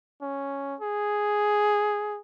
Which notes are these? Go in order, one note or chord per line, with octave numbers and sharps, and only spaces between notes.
C#4
G#4